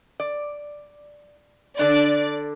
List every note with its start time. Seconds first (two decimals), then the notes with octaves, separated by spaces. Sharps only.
0.20 D5
1.79 D3 D4 D5